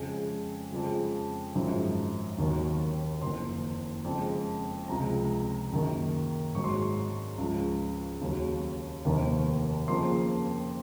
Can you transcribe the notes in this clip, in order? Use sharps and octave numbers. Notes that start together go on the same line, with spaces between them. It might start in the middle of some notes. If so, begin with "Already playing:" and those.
Already playing: F2 C#3 G#3 G#5
F2 C#3 F3 G#3
G#1 F#2 F3 G#3
D#2 D#3 F#3
F#1 F2 D#3 A#3 C6
F2 C#3 G#3
C#2 C3 F3 G#3 A#5
F#2 D#3 A#3
G#1 G#2 F#3 C#6
C6
C#6
C#2 C#3 F3
D#2 C#3 F#3
F1 D#2 D#3 A#3
F2 C#3 F3 A#3 C6